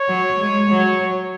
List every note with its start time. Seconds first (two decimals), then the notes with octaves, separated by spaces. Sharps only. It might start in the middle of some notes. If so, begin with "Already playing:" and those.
Already playing: C#5
0.08 F#3
0.40 G#3
0.70 F#3